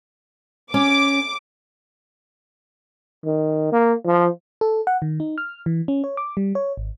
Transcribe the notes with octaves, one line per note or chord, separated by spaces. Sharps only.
C#4 D6
D#3
A#3
F3
A4
F#5
D#3
D#4
F6
E3
C#4
C#5
D6
G3
C#5
G#1